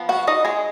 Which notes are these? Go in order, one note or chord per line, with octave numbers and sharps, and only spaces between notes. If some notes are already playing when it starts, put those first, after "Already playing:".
Already playing: F3 B3
F#4 F#5
D#4 D#5
G#3 G#4